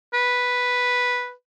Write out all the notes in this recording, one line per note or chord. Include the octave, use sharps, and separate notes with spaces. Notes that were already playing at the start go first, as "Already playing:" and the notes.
B4